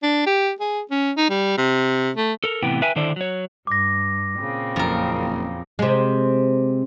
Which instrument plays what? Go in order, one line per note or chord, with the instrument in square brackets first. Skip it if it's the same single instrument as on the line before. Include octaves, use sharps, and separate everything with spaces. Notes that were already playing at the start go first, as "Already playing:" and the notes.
[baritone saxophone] D4
G4
G#4
C#4
D#4
G3
C3
A3
[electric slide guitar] A4 A#4
A2 C3 E3 B3 G5
B4 E5 G5 G#5
D3 D#3 E4 A4 C5 D5
F#3 C#5
[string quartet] G2 [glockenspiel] D6 A#6
[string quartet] A#2 C#3 C4
[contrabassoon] F#1 [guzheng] F2 A#4
[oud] C3 G#3